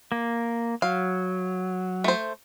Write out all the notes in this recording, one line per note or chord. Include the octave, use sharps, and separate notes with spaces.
A#3
F#3 F5
A3 C5